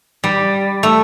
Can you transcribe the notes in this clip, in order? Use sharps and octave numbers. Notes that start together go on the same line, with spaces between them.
G3
A3